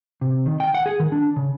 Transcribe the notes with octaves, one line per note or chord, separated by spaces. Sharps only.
C3
D#3
G5
F#5
G#4
D#3
D4
C#3